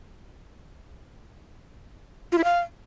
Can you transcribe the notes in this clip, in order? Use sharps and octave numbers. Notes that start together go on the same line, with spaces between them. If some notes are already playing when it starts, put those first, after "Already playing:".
F4
E4
F5